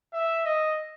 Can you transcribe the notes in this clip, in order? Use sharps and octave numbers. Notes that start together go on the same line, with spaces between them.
E5
D#5